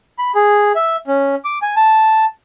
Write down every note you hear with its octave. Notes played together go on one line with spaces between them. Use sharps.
B5
G#4
E5
C#4
D6
G#5
A5